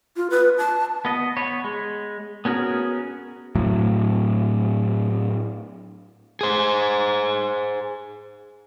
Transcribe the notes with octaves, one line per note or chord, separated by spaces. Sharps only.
F4
B4
A5
B3 D#5
B3 B4 C#5
G#3
B3 C#4 F#4 G#4 A#4
A2 F#3
G#4 C5